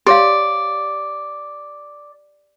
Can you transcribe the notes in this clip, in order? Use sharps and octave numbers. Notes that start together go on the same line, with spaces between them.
G4 C#5 D5 F5